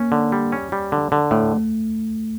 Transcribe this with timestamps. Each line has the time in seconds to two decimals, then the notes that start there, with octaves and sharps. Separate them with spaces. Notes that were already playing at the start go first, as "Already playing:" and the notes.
Already playing: A#3 C#4
0.12 D3
0.32 G3
0.52 C#4
0.72 G3
0.92 D3
1.12 D3
1.31 A2 A3